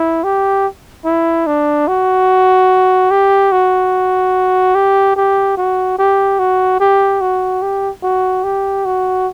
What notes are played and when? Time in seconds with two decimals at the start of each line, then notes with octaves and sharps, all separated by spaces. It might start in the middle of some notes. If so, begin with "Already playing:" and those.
Already playing: E4
0.24 G4
1.05 E4
1.47 D4
1.88 F#4
3.11 G4
3.52 F#4
4.75 G4
5.16 G4
5.57 F#4
5.98 G4
6.39 F#4
6.80 G4
7.21 F#4
7.62 G4
8.03 F#4
8.44 G4
8.85 F#4